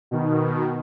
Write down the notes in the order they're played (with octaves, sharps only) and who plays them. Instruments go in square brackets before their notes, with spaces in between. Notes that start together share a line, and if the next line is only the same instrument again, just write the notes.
[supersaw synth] B2 D#3